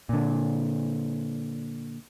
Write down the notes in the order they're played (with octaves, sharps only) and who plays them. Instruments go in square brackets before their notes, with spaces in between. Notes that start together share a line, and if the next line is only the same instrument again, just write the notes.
[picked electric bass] A#2 D3